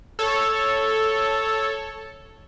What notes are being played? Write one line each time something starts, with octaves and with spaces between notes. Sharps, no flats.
A4 C#5